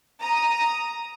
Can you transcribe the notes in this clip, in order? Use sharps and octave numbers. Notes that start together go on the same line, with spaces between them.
A#5 D#6